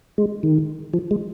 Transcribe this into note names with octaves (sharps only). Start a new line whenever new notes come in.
G#3
D#3
F3
G#3